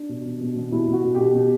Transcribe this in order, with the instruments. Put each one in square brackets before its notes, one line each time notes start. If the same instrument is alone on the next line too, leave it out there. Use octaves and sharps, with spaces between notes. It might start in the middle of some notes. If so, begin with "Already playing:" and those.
Already playing: [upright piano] D4
B2
B2
B2
B2
B2 E4
B2
F#4
B2
G4
B2
B2